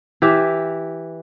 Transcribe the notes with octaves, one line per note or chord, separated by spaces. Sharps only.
E3 G4 E5